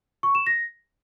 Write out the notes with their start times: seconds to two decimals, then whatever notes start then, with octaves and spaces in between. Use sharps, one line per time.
0.23 C#6
0.35 E7
0.47 A#6